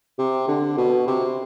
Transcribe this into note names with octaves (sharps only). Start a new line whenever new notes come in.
C3
D3
B2
C3